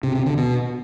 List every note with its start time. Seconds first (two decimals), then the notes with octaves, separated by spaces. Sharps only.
0.04 C3
0.15 C3
0.26 D3
0.37 B2